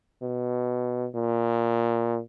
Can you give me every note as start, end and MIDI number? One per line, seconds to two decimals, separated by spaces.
0.22 1.07 47
1.15 2.19 46